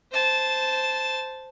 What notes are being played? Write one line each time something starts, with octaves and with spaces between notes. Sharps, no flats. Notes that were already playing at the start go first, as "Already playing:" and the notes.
C5 A5